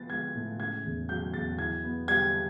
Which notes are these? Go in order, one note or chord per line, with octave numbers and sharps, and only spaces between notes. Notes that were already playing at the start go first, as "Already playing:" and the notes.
Already playing: F3 B3 A6
G#3 G#6
A2
C#3 G#6
E2
F#3 G6
E2 A6
E3 G#6
B3
G3 G#6